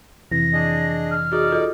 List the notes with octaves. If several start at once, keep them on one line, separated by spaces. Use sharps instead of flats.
F2 C3 E3 A#6
D4 G#4 D#5
F6
D#4 F#4 G#4 D5
F4 A4 D#5